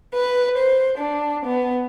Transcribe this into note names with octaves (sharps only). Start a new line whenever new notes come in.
B4
C5
D4
B3